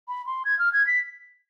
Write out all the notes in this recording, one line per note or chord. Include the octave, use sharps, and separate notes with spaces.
B5
C6
G#6
F6
G#6
B6